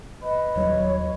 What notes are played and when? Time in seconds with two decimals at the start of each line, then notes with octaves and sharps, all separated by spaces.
0.23 B4 D#5
0.56 D#1 F#3 C#5